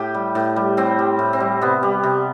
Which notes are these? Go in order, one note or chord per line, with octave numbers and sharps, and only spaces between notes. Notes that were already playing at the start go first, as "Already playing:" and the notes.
Already playing: A2 G4
G3
A2
G3
A2 C4
G3
A2
C4
G3
C3 B3
G3
C3